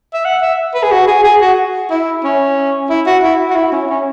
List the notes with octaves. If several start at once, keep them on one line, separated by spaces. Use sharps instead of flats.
E5
F#5
E5
B4
G#4
F#4
G#4
G#4
F#4
E4
C#4
E4
F#4
E4
F#4
E4
C#4
C#4